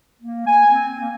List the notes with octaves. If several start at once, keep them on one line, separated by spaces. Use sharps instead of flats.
A#3
G#5
C4
A#3